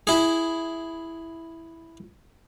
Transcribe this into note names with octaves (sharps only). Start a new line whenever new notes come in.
E4 G#4